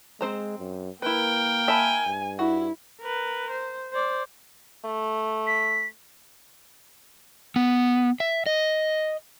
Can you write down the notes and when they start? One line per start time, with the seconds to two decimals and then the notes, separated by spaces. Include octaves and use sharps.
0.21 G#3 C4 C5 A#5
0.59 F#2
1.02 A#3 E4 A#4 B4 G5
1.68 E5 G#5 A5 B5
2.07 G2
2.39 E4 F#4
3.01 A#4 B4
3.51 C5
3.93 C5 D5
4.85 A3
5.47 B6
7.56 B3
8.20 E5
8.46 D#5